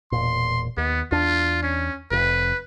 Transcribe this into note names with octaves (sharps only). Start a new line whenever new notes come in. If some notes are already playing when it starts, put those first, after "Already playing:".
E1 A#2 C6
D#2 B3
E2 D4 F4
C#4
F1 F2 B4